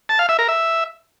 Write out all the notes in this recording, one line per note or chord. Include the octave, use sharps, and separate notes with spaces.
A5
F5
E5
A#4
E5